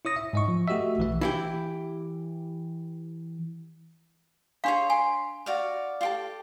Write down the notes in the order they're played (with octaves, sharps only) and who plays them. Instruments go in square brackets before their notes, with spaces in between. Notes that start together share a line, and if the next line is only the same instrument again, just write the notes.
[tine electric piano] E4 C#5 D#6 A#6
E5
G#2 D#5 C#6
F3
A3 F#4 G4 D#5 E5
B1 E3 E5
[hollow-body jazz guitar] E3 E4 G4
[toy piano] D4 F5 [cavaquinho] G#4 C#5 C6
[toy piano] G#5 [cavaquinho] C6
[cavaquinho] F#4 D5 F5
F4 G4 A4